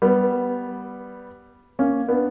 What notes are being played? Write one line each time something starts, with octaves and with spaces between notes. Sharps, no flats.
G3 B3
A#3 C#4
B3 D4